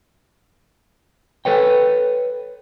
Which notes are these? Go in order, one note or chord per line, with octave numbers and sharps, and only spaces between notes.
A4 B4 C#5 G5